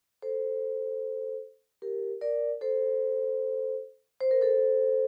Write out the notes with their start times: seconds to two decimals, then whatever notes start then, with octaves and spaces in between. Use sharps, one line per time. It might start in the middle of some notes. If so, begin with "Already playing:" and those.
0.22 A4 C5
1.82 G4 A#4
2.21 A#4 D5
2.61 A4 C5
4.21 C5
4.31 A#4
4.41 A4 C5